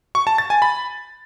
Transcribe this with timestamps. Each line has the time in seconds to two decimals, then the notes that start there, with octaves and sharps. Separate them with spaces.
0.15 C#6
0.27 A5
0.38 A6
0.50 G#5
0.62 B5